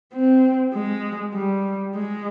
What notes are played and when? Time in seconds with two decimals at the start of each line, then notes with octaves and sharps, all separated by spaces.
0.13 C4
0.73 G#3
1.34 G3
1.95 G#3